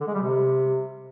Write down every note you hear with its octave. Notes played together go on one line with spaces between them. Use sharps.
D3
G#3
G3
C3